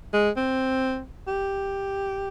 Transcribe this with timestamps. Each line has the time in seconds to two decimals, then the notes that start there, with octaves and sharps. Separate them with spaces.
0.13 G#3
0.37 C4
1.28 G4